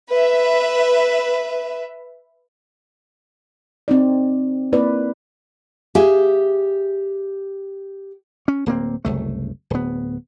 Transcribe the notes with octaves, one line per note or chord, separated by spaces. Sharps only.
B4 E5
C4 D#4 D5
A#3 C4 E4 B4 D5
G4 G#4 E5 F5 G#5
C#4
D1 A#3 C4
F#1 C2 A3
D1 B3